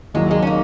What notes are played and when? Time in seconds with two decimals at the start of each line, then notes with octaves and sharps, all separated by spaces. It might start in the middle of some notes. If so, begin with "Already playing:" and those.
0.14 D#2 D#3 F#3 G#3
0.31 G#3
0.42 C#4
0.47 A#3